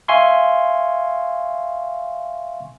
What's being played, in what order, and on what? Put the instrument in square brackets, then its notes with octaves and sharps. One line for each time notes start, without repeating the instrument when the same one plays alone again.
[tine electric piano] E5 F5 G#5 C6 C#6